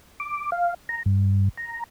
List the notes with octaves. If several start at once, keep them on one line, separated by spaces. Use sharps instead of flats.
D6
F5
A#5
G2
A#5